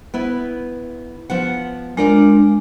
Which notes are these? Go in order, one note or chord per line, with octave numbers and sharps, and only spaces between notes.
B3 E4 B4
F3 B3 F#5
G#3 D4 F4 A#4 D5